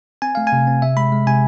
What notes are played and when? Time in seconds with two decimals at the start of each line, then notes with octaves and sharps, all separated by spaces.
0.22 C4 G#5
0.35 A3 F5
0.47 G#5
0.52 C3
0.67 C4
0.82 C3 E5
0.97 G#3 B5
1.12 G#3
1.27 C3 G#5